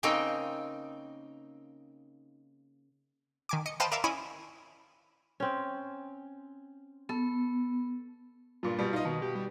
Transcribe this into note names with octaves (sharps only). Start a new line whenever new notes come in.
C#3 A#3 C4 D#4 G5
D#3 G#5 D6
D#5 C#7
B4 C5 D#5 F5 G5 A5
A#4 D5 E5 F5
C#4 E4 D#5 G#5 B5
C4 C#4
B3 A4
G2 A#2 F4
B2 G3
D#4 F4 D#5
B2 D#3
G4
G3